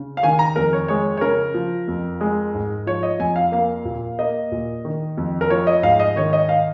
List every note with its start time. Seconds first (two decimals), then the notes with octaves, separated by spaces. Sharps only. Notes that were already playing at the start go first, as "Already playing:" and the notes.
Already playing: C#3
0.17 F5
0.23 D#3 G#5
0.39 A#5
0.56 F2 A#4
0.73 C#5
0.88 G#3 C#5
1.17 C#5
1.21 C#3 A#4
1.54 F3
1.88 F2
2.21 G#3
2.54 G#2
2.87 F3 C#5
3.03 D#5
3.19 F2 G#5
3.36 F5
3.52 A#3 F5
3.85 A#2
4.19 A#3 D#5
4.52 A#2
4.85 D#3
5.17 F2
5.41 A#4
5.50 F3 C#5
5.67 D#5
5.83 G#2 F5
6.00 D#5
6.16 D#3 C#5
6.33 D#5
6.49 F5